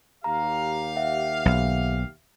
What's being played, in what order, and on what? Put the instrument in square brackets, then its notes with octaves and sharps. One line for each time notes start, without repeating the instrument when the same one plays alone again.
[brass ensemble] D#2 G4 F5 [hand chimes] A#5
[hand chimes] E5 F#5
[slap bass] B1